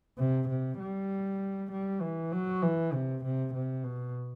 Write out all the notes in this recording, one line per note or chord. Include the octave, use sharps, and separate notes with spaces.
C3
C3
G3
G3
E3
F#3
E3
C3
C3
C3
B2